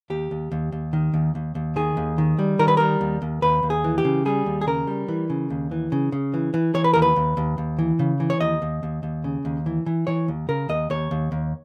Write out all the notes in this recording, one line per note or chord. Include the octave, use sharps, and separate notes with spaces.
D#2 G4
D#2
D#2
D#2
D#3
D#2
D#2
D#2
D#3 G#4
D#2
D#3
G3
D#3 A#4
B4
G3 A#4
D#2
D#2
D#2 B4
D#2
G#4
E3
G4
C#3
G3 G#4
D#2
G#4
C#3 A#4
G3
E3
C#3
D#2
E3
C#3
C#3
E3
E3
E3 C#5
B4
D#2 A#4
B4
D#2
D#2
D#2
E3
C#3
E3
C#5
D#2 D#5
D#2
D#2
D#2
C#3
D#2
E3
E3
E3 C#5
D#2
C#3 A#4
D#2 D#5
D#2 C#5
D#2
D#2